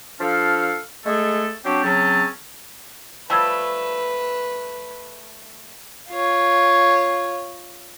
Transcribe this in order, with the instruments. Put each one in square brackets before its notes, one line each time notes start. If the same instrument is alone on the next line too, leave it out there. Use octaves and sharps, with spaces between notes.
[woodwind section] F3 D4 A4 F5
G#3 A3 G#4 A4
F#3 C4 D4 G4
C#3 F#3 C4 C#4 A5
[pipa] F3 G3 A3 [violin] B4 [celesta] A5 E6 G#6
[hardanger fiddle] F4 C#5